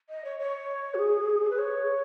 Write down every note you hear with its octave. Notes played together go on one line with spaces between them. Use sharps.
D#5
C#5
C#5
F#4
G#4
B4
C#5